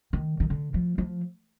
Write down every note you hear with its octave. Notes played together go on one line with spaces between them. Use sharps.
D#3
D#3
D3
F3
F3